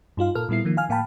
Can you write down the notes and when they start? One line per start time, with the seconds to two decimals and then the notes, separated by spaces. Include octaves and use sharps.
0.17 G2 D#4 F4 F5
0.35 A#2 A4 A#4 F6
0.49 A#2 G3 B3 E4 C7
0.65 D#3 F3 A#3
0.77 F5 G#5 F6
0.89 A2 A#3 F5 G5 A5 B5